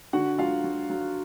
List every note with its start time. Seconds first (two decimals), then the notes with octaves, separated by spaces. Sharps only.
0.13 D3 F#4 F#5
0.38 F#3 F4 F5
0.64 F#3
0.90 F#3